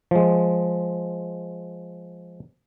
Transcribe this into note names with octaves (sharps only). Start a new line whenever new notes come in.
F3 G#3